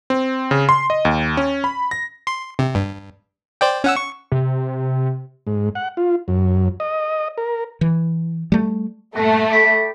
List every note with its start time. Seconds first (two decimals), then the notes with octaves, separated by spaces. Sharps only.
0.10 C4
0.51 C#3
0.69 C6
0.90 D#5
1.05 D#2
1.37 C#4
1.64 B5
1.91 A#6
2.27 C6
2.59 C3
2.75 G2
3.61 C5 D5 G5
3.84 C#4 F#5 E6
3.96 C#6
4.32 C3
5.47 G#2
5.75 F#5
5.97 F4
6.28 F#2
6.80 D#5
7.38 A#4
7.81 E3
8.52 G3 A3
9.15 G2 A#2 A3 F#4
9.50 D5 G5 B5